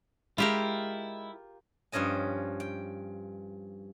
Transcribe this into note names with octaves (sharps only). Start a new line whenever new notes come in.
G#3 E4 F4 G4 A#4
G2 F3 C#4 D#5 G#5
G5